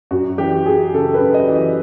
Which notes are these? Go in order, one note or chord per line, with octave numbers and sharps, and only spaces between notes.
F#2 F#4
E3 G4
F#2 G#4
C#3 A4
B4
F#2
D#5
E3
D#5